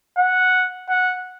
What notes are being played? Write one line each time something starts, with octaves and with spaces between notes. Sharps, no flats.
F#5
F#5